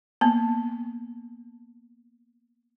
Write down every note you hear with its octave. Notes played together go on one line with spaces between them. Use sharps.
A#3 B3